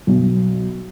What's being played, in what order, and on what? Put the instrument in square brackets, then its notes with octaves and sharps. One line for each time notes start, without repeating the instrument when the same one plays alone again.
[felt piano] B1